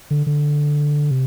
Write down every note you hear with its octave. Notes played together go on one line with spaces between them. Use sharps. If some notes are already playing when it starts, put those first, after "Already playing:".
D3
D3
C3